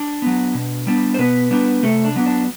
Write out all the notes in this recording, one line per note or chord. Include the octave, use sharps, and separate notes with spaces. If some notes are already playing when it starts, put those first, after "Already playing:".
Already playing: D4 D5
F#3 B3
B2
G3 B3 D4
C5
B2 B3 B4
G3 B3 D4
C3 A3 A4
D4
F#3 B3 D4
D4